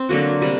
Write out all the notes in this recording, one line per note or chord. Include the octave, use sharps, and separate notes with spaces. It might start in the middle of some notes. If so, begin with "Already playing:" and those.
Already playing: C4
D3 F#3 A#3 F#4
C3 G3 D4